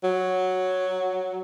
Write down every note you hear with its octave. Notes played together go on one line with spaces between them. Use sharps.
F#3